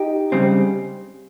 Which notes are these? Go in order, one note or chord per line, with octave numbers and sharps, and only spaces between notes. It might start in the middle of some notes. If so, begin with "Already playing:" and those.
Already playing: D#4 G4
C#3 G3 C4